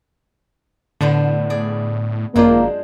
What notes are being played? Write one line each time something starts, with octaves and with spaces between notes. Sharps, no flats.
A2 D3 B3 D4 C5
G#4 D5
G#1 F#2 G#3 A#3 D4 F4 C5